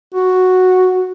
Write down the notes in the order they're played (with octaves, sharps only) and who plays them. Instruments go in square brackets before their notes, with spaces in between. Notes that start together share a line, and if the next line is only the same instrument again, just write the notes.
[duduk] F#4